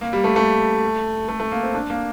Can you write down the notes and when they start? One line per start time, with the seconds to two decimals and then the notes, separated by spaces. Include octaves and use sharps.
0.01 A#3
0.13 G3
0.24 A3
0.36 A3
1.29 A3
1.40 A3
1.52 A#3
1.63 C4
1.74 D4
1.90 A#3